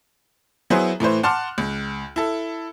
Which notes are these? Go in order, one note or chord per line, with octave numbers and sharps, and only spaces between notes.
F#3 B3 E4 G#4 C5
A2 E3 B4 C5
F#5 A5 C6 D6 F6 F#6
C#2
E4 A4